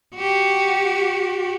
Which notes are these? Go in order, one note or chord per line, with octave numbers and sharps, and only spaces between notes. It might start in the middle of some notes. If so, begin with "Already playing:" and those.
F#4 G4